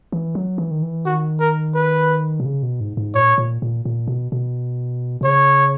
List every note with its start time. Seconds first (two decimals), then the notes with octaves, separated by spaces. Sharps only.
0.12 E3
0.35 F#3
0.58 E3
0.71 D#3
0.83 E3
1.05 D#3 F#4
1.40 A#4
1.75 B4
2.40 B2
2.45 C#3
2.63 B2
2.81 G#2
2.97 G#2
3.15 A#2 C#5
3.38 A#2
3.62 A#2
3.85 A#2
4.08 B2
4.32 B2
5.21 B2
5.24 C#3 C#5